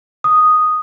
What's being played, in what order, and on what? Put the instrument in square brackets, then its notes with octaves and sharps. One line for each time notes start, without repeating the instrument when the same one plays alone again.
[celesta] D#6